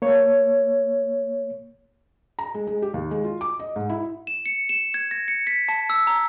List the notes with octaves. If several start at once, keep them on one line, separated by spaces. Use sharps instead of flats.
A#3 C#5
A#5
G#3
G#3
G4
D#2
G#3
F4
D6
D#5
G#2
E4
E7
C#7
E7
G#6
A#6
C#7
B6
A5
E6
A#5